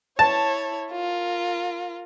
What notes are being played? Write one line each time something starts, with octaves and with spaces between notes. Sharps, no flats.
E4 C#5 A5
F4 A#4